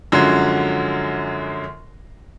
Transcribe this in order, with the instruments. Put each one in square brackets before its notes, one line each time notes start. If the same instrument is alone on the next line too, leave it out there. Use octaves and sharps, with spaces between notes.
[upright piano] F#2 D3 F3 F#3 G#3